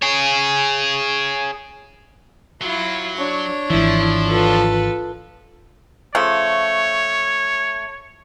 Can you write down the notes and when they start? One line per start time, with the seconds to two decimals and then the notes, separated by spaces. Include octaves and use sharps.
0.02 G#4 C#5
2.61 F#3 E4 F4
3.17 D4 C#5
3.70 G#1 E3 F3 E4
4.27 F4 A4 B4
6.15 C#3 F3 A3 C#5